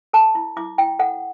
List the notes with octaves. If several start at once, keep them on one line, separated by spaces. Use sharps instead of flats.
A4 A5
E4
E4 D6
E4 G5
A4 F#5